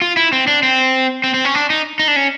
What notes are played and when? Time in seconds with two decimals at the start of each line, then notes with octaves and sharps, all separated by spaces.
0.02 F4
0.17 E4
0.32 C4
0.47 D4
0.63 C4
1.24 C4
1.34 C4
1.45 C#4
1.55 D4
1.70 D#4
1.99 D#4
2.08 D4
2.16 C#4